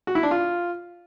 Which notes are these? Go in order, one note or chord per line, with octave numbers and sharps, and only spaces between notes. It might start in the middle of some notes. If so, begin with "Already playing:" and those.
F#4
E4
D4
F4